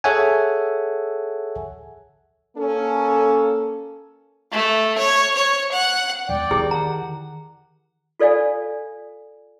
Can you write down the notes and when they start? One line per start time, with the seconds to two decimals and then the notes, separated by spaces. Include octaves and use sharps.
0.04 G#4 A4 C#5 E5 F#5 G#5
2.56 A#3 C#4 A4
4.52 A3
4.98 C#5
5.36 C#5
5.72 F#5
6.29 E2 D5 G5
6.51 D#3 E4 G4 G#4
6.71 F#5 A#5
8.20 F4 A4 D5 F5 G#5